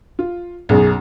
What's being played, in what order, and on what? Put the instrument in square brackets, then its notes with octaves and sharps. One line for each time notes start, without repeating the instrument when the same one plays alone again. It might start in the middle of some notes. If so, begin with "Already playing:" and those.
[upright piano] F4
[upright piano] B1 F#2 [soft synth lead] G#4